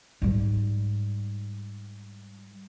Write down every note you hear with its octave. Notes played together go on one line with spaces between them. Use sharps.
G#2 G3